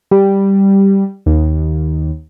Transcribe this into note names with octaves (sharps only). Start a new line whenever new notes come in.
G3
D#2